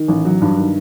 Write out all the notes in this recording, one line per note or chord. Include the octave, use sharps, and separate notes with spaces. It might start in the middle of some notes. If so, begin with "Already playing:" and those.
Already playing: D#3
A1
F#3
G2
D#3